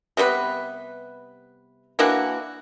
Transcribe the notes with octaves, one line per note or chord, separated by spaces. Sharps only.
C3 G3 B3 B4
E3 A#3 D4 F#4